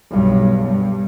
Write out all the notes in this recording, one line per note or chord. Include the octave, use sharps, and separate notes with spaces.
B1 G2
G2